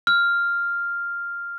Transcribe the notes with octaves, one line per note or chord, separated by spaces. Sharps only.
F6